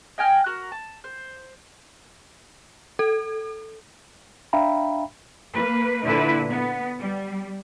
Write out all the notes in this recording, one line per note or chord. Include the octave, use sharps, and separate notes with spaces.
D#5 G5 G#5 F6
F#4 A#4
A5
C5
A4
D4 E5 F5 G5 A#5 B5
A#3 B4
A#2 D3 E4 B4
B3
G3